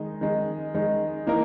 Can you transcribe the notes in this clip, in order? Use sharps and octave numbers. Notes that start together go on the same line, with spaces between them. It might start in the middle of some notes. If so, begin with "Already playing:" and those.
Already playing: D#3 G#3 D#4
D#3 G#3 D#4
D#3 G#3 D#4
E3 A#3 D#4 A#4